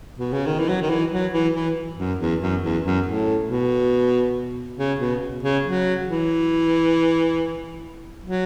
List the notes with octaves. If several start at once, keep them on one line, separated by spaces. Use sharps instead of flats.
B2
C#3
D#3
E3
F#3
D#3
E3
F#3
E3
E3
F#2
E2
F#2
E2
F#2
A2
B2
C#3
B2
C#3
F#3
E3
F#3